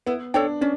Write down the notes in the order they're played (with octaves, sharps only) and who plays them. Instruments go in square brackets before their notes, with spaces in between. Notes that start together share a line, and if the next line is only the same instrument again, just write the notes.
[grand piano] B3 [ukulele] E4
[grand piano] D4 [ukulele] A4 C#5 G5
[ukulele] C#4 [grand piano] D4